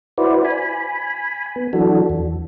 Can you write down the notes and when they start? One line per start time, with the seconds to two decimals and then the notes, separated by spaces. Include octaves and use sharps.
0.18 E4 F#4 B4 C5 D5
0.45 G#5 B5
1.56 B3
1.73 E3 F#3 D4 F#4 A4
2.09 E2